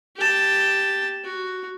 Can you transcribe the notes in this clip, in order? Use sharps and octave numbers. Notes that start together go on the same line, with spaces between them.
G4 A5
F#4